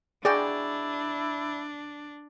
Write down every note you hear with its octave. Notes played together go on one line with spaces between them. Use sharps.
B2 D4 E4 F#4 G#4 D5 G5